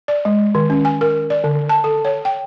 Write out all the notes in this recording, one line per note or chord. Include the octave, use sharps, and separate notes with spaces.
D5
G#3
D#3
C#4
G#5
A#4
D5
D3
A5
A4
C#5
G5